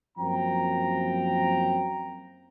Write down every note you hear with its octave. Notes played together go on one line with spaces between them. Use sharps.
F#2 F3 A#3 C4 G5 A#5